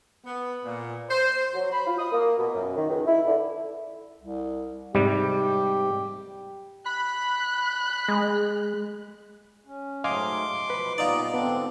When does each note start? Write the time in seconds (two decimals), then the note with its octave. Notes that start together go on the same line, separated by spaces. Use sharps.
0.24 B3
0.64 A#2
1.10 C5
1.53 F#3
1.72 B5
1.87 F4
1.98 D#6
2.12 A#3
2.39 B2
2.54 F#2
2.76 D#3
2.89 C#2
3.07 E4
3.26 D3
4.20 C2
4.95 G#2 C3 G3 G4
6.86 B5 F#6
8.08 G#3
9.66 C#4
10.04 G#2 F#3 A3 D#5 F5 G#5 C6 D6
10.70 B2 F3 B4 B5
10.98 A#2 G3 B3 D#4 F4 D5
11.34 G#2 D3 B3 C4 D4